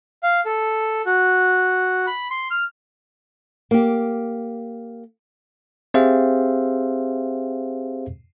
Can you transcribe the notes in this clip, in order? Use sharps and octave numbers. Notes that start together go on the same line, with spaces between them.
F5
A4
F#4
B5
C6
F6
A#3 G4
C4 G4 G#4 C5 E5 F5